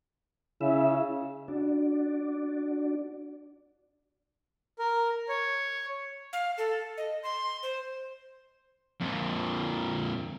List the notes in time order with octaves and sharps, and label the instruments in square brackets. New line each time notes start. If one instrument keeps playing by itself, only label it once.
[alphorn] C#3 [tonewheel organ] E4 E5
[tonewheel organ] D4 F#4 D5
[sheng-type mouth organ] A#4
C#5
[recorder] F5
A4
D#5
C6
C5
[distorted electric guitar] F2 A#2